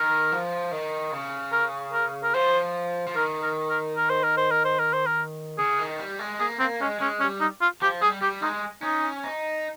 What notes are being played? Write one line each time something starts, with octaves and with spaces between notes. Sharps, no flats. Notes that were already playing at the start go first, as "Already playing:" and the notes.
Already playing: D#3 A#4
F3
D#3
C#3
A#4
A#4
A#4
F3 C5
F3
D#3 A#4
A#4
A#4
A#4
C5
A#4
C5
A#4
C5
A#4
C5
A#4
C#3 G#4
D#3
G3
G#3
A#3 G#4
A#3 C4
G#3 C#4
G#3 C#4
G3 C#4
D#4
F4
F3 G4
G3 G#4
G3 G4
G#3 D#4
C#4 D#4
D#4